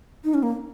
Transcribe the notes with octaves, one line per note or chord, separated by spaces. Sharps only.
D#4
C#4
A#3